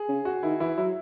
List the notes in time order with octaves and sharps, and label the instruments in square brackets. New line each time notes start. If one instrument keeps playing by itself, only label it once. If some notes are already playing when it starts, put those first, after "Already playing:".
Already playing: [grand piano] G#4
[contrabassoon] C#3
[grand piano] F#4
[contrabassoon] D#3 [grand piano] E4
[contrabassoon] E3 [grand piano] E4
[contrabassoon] F#3 [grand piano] E4